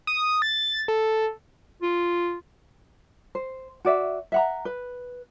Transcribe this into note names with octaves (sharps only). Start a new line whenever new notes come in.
D#6
A6
A4
F4
C5
F#4 D5 E5
E5 F#5 A#5
B4